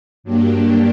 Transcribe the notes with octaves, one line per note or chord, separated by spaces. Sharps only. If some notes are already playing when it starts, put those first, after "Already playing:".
G2 F#3 A#3 D4 G4